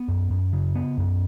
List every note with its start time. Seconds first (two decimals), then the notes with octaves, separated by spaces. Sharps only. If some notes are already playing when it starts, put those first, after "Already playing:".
Already playing: B3
0.08 F#2
0.31 F#2
0.53 C#3
0.76 B3
0.98 F#2